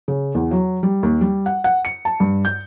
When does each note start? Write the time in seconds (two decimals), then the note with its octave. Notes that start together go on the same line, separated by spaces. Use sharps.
0.08 C#3
0.35 E2
0.51 F#3
0.83 G3
1.03 D#2
1.21 G3
1.46 F#5
1.64 F#5
1.85 C#7
2.05 A5
2.20 G2
2.45 G6